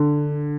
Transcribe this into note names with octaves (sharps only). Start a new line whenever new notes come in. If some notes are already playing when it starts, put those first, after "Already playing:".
Already playing: D3